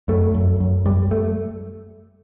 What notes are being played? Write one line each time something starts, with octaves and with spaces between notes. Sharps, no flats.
F#2 A3
F#2
F#2
F#2 G3
A3